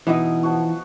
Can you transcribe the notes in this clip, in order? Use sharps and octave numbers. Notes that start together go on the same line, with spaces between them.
B2 E3 D#4
F3 F#4